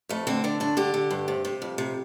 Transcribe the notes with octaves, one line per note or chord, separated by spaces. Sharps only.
F2 A3
D3 C4
D3 D4
G2 D4
D3 G4
D3
G2
C3
C3
F2
C3